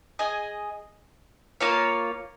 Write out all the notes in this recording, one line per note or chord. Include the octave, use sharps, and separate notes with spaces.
G#4 D#5 G#5
A#3 F4 C#5 F5